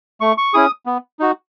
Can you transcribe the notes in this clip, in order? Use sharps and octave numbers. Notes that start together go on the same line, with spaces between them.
A3 C#6
C#6
C#4 E4 G#4 D#6
B3
D#4 F#4